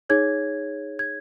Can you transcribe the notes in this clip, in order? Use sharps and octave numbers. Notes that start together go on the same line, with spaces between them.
D#4 G#4 C#5 G#6
G#6